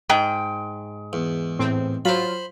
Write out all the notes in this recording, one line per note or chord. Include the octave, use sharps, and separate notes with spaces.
G#2 G5
E2
A2 C4
F#3 F4 C5 B5